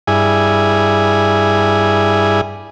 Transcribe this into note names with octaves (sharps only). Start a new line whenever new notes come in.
G2 E4 G#4 G#5